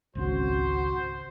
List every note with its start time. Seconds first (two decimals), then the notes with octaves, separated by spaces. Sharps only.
0.15 G#1 C#2 C#4 F#4 C5